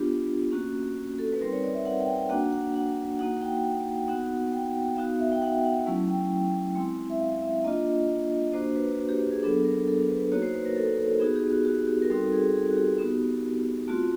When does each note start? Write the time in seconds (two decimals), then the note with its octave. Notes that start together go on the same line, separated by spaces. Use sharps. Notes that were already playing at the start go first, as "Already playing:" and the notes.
Already playing: B3 D4 F4 G4
0.52 A#3 C#4 F#4
1.19 A4
1.32 B4
1.40 G3 C4 D#4 A#4
1.52 C#5
1.63 D5
1.74 E5
1.85 F#5
2.00 G5
2.15 G5
2.29 A#3 D4 F#4 F#5
2.53 F#5
2.74 F#5
3.19 A#3 D#4 F#4 F#5
3.42 G5
4.08 B3 D#4 F#4 F#5
4.52 G5
4.96 B3 D#4 F#4 F5
5.19 E5
5.32 G5
5.42 F#5
5.64 F#5
5.86 F#3 A3 C#4 E4
6.08 G5
6.75 G#3 C4 E4
7.10 E5
7.20 F5
7.42 E5
7.64 A#3 D4 F4 D#5
8.53 A#3 D4 F#4 C5
8.76 B4
8.98 F#4
9.09 G4
9.21 G4
9.31 G#4
9.43 F#3 B3 D4 A4
9.64 A#4
9.87 A4
10.08 B4
10.32 A#3 D#4 F#4 C#5
10.42 C5
10.54 B4
10.65 A#4
10.76 A4
10.98 A4
11.20 B3 D#4 F#4 G#4
11.36 G4
11.50 F#4
11.65 F#4
11.87 G4
12.02 A#4
12.10 G3 C4 D#4 F#4 A4
12.32 G#4
12.54 G#4
12.69 F#4
12.76 G4
12.99 B3 D#4 F#4
13.88 A3 C4 F4 F#4